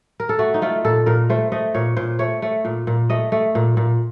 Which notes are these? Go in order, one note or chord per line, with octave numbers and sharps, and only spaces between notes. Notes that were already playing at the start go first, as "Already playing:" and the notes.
A#4
A4
A3 F#4
D#4
A3 F4
A#2 A4
A#2 A#4
A3 C5
A3 D#5
A#2 C#5
A#2 C5
A3 C#5
A3
A#2
A#2
A3 D#5
A3
A#2
A#2